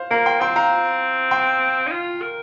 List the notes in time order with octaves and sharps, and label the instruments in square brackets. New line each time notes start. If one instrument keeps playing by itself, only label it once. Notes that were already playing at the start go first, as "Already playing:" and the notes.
Already playing: [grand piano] C5 F5
[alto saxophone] A#3 [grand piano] F5 A#5
[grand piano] G5 C6
[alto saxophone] C4 [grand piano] G5 C6
[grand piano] F5 A#5
G5 C6
[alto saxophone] D#4
F4
A#4